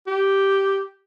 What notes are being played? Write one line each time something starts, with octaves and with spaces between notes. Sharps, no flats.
G4